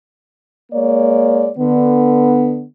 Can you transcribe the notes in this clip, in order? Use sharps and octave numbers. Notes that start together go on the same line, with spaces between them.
G#3 A#3 C#5 D5
D3 B3